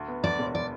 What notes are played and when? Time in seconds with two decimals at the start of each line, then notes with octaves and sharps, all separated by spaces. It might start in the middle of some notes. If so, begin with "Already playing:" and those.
Already playing: D2
0.08 B3
0.23 D2 D5
0.39 E1
0.55 D5